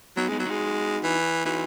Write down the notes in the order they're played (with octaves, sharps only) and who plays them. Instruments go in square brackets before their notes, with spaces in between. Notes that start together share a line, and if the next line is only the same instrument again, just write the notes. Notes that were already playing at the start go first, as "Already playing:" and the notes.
[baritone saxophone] F#3 [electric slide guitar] B3 D#4
[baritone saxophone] G#3 [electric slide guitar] B3 D#4
[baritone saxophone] F#3
[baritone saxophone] G#3 [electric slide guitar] D#4 F#4
[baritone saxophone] E3
[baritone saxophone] E3 [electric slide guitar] D#4 F#4